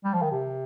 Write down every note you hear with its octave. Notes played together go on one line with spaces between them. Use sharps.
G3
F3
D#3
C3